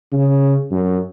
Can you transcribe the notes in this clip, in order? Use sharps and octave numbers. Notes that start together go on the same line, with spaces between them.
C#3
F#2